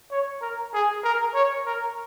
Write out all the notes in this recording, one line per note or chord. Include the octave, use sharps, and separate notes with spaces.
C#5
A#4
G#4
A#4
C#5
A#4